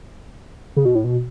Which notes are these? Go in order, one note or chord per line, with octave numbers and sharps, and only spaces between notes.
C#3
B2
A2
B2